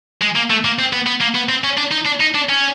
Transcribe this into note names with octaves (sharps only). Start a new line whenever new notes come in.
G#3
A#3
A3
A#3
C4
B3
B3
A#3
B3
C4
C#4
D4
D#4
D4
D#4
D4
C#4